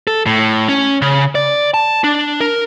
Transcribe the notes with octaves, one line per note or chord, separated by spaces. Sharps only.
A4
A2
C#4
C#3
D5
A5
D4
A#4